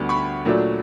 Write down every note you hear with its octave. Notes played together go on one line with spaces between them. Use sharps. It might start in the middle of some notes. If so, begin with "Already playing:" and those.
Already playing: D2 D3 G3 B3
B5 C#6
A#2 F#3 A3 D4